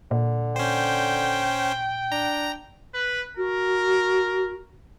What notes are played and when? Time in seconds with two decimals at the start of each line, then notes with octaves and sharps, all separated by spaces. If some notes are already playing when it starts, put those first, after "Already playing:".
0.11 A#2 D3
0.56 C#4 C5 G5
2.12 D4 A#5
2.94 B4
3.37 F#4 A#4